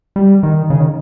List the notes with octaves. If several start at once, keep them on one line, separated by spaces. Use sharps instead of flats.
G3
D#3
C#3
D#3